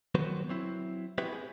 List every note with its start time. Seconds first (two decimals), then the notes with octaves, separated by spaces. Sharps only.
0.15 D#3 F#3 B3 F#4 B4 C5
0.49 F#3 C4 E4
1.18 B3 C4 E4 F#4 G4 B4
1.33 G#4